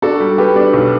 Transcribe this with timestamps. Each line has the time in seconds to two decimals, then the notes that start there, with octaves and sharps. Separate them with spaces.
0.02 D4 F#4 A4
0.20 G3
0.38 G3 G4 B4
0.56 D4
0.73 B1